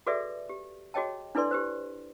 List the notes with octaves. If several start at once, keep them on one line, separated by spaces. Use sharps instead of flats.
F#4 G#4 A4 B4 D5 E5
G4
F#4 G#4 C#5 D#5 G5 A5
D4 E4 A4 B4 D5 C6
G4 B4 C5